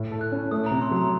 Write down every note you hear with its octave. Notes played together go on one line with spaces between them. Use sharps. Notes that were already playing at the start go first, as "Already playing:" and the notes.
Already playing: A2
A4
F#6
C#4
A3 D#6
C3 A#5
C6
F#3 A#5